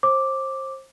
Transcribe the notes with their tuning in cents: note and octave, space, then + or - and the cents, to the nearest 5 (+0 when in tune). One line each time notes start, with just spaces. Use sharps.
C5 +30 D6 +0